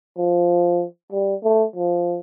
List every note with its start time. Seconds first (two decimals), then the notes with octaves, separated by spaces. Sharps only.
0.17 F3
1.12 G3
1.44 A3
1.76 F3